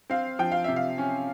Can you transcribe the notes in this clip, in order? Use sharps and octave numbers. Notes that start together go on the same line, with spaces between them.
C4 F5
F3 G5
F5
C3 E5
F5
C#4